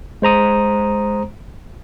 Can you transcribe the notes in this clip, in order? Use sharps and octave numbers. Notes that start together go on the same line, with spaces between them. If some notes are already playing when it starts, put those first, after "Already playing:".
G#3 C5 A#5 D#6